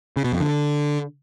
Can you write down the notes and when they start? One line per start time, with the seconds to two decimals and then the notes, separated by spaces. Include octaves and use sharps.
0.17 C#3
0.24 B2
0.32 F2
0.40 D3